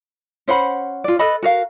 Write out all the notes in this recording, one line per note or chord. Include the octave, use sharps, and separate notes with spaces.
C#4 C5 F#5 B5
F4 D5
A4 B4 D#5 B5
F#4 A#4 F5